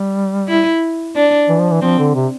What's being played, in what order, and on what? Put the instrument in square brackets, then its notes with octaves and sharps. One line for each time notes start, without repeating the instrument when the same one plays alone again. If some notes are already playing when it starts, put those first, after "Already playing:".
Already playing: [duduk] G3
[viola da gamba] E4
D4
[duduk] E3
F3
E3
[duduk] F3 [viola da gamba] C4
[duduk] D3
C3